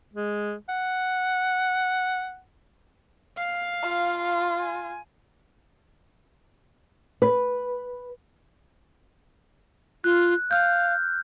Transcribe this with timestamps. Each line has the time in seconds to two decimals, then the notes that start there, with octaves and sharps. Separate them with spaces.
0.14 G#3
0.69 F#5
3.37 F5
3.83 F4
4.60 G#5
7.22 B4
10.04 F4 F#6
10.51 F5 F6 G6